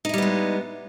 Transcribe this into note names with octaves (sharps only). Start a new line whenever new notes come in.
G3 G#3 B3 D#4 E4